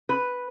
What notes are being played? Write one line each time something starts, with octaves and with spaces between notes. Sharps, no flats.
B4